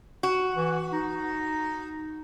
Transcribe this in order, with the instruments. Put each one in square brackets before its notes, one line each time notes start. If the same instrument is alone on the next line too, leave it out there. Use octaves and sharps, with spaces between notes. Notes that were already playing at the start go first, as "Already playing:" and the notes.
[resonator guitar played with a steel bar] F#4
[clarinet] E3
D#4